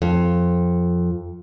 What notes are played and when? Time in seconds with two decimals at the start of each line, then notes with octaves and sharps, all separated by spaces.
0.02 F2